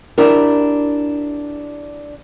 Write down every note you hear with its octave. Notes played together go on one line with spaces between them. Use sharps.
D4 E4 G4 A#4